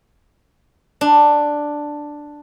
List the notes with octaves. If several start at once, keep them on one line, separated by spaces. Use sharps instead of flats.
D4